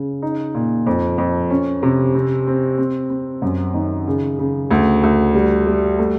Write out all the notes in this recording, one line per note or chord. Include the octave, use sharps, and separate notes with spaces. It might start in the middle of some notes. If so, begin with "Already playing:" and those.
Already playing: C#3
D#4
A#2
F2
F2
C#4
C3
C4
C4
C4
C4
F#2
D#3
C#3
C#3
D2
D2
G3
G3
A3